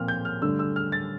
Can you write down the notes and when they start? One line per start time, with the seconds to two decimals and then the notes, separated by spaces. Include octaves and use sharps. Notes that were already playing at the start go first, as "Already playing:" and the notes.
Already playing: A#2 F3 C4 F6
0.08 G6
0.25 F6
0.41 G2 D3 A3 D4 E6
0.59 E6
0.76 F6
0.92 A6